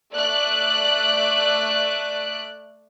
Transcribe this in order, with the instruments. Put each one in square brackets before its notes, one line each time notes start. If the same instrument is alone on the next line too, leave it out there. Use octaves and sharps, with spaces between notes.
[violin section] A3 D5 F#6 D7